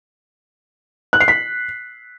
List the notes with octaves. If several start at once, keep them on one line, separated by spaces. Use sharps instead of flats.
F#6
C7
B6